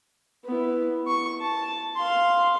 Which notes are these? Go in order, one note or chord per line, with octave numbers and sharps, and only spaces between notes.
B3 E4
C#6
A5
F5 C6